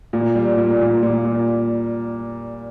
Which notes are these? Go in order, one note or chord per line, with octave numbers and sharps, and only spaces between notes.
A#2
G3
A#2
A#2
A#2
A#2